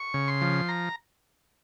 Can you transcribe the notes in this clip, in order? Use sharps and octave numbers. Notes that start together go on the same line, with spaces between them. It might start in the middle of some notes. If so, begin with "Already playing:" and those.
Already playing: C#6
C#3
C6
F3
A#5